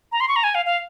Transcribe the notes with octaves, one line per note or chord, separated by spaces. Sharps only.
A#5
C6
C#6
A#5
G#5
F5
F5